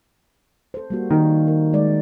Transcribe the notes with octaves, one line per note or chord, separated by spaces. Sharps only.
A4 C5
G3 A#3 F#4
D#3 A#3 A#4
A#4
G3 G#3 D5